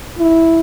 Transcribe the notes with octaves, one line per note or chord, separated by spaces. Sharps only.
E4